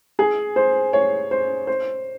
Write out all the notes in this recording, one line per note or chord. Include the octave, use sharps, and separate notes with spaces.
G#4
C5
C#5
C5
C5